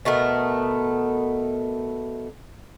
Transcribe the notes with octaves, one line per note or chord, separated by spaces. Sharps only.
B2 A3 B3 A#4